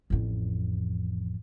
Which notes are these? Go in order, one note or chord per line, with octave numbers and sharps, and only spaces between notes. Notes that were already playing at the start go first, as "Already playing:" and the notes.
A1 F2